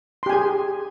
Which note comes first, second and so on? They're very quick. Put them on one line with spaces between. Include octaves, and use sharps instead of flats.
C6 G4 G#5 G#4